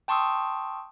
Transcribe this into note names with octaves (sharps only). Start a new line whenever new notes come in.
G5 A5 C6 C#6 D#6 E6